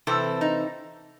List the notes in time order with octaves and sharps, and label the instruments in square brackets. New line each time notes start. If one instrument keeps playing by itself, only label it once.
[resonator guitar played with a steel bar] C3 E3 C4 A4
D#4